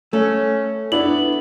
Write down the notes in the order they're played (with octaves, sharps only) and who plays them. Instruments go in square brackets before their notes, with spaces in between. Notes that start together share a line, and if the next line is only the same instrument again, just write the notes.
[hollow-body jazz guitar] A3 [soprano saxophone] C#4
[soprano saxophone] B3 [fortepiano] D4 E4 A4 [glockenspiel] F#7